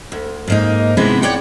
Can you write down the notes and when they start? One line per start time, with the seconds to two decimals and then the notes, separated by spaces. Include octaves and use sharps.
0.12 D2
0.48 G#2 A#3 D#4
0.97 C3 G#3 B3 E4
1.22 C#5 D5 F#5 G5